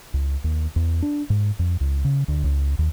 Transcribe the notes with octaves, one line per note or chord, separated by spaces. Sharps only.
C#2
D#2
E2
D4
G#2
F2
C#2
C#3
D2
C#2
D#2